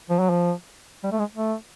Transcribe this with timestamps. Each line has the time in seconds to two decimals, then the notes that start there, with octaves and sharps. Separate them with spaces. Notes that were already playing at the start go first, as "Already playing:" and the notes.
0.10 F3
0.20 F#3
0.30 F3
1.04 G3
1.12 A3
1.19 G#3
1.35 A3